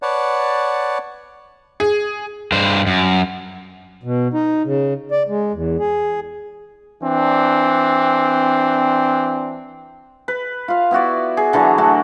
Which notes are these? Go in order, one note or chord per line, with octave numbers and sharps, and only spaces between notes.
B4 C#5 D5 F#5 A5
G#4
G2 C5
F#2
B2
D#4
C#3
D5
G#3
E2
G#4
E3 C4 D4
B4
F4 F5
B3 E4 F#4 D5
G#4
D3 E3 F#3 A#5
A3 D4 F#4